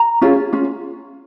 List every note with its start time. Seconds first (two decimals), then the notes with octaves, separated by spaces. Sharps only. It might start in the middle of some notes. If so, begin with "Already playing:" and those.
Already playing: A#5
0.21 C#4 F4 G#4
0.53 C#4 F4